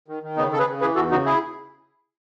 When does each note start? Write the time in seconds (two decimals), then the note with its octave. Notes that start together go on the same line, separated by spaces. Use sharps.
0.08 D#3
0.23 D#3
0.37 C#3 B3 D#4
0.52 C#3 A4
0.59 G#4 B4
0.67 C#3
0.81 E3 G#4 B4
0.96 E2 F#4 A4
1.11 C#3 D#4 F#4
1.25 E4 G#4